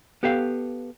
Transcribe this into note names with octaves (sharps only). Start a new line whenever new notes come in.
B3 G4 A4 F5